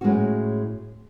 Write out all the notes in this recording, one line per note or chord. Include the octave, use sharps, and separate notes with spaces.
A2 G#3 C#4 F#4